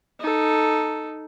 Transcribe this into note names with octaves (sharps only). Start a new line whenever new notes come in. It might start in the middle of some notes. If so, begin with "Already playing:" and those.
D#4 A4